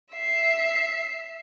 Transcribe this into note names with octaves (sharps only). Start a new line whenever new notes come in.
E5 C7